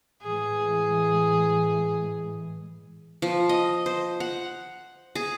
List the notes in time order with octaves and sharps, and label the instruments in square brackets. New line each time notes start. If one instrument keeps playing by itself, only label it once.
[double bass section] A2 E3 G#3 [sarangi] G#4
[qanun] F3
D#5
C5
F#5
G#4